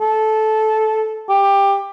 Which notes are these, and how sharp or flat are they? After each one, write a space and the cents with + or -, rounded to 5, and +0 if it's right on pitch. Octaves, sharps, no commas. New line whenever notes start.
A4 -15
G4 +15